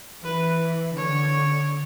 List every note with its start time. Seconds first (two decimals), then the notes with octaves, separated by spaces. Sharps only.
0.24 E3 B4
0.96 D3 C#5